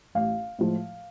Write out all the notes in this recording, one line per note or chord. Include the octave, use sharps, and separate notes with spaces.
A1 F5
A2 F3 G#3